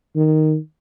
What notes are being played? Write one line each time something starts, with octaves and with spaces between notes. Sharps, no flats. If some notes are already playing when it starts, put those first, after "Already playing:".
D#3